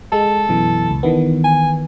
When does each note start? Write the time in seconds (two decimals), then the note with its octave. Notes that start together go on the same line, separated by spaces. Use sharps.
0.12 G#3 A4
0.49 F#2 B2 E3
0.90 C#2
1.03 D#3 E3 B3
1.44 G#5